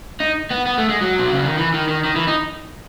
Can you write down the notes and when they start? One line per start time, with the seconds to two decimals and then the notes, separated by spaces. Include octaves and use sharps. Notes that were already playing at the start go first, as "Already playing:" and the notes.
0.20 D#4
0.51 B3
0.66 B3
0.78 A3
0.89 G#3
1.01 F#3
1.19 B2
1.33 C#3
1.45 D#3
1.58 E3
1.74 D#3
1.89 D#3
2.05 D#3
2.16 E3
2.27 D#4